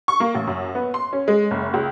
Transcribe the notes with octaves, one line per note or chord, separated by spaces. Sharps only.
C#6
A#3
A1
F#2
B3
C6
C#4
G#3
F#1
C#2